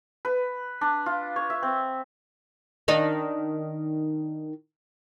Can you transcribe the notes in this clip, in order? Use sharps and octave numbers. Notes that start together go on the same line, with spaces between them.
B4
D4
F4
C#5
E5
C4
D#3 D4 D#4